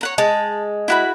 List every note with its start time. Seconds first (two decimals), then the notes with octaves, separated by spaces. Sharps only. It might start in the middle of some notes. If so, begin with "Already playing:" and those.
0.01 C#5 F#5 A#5
0.18 G#3 A5
0.88 E4 F#4 B5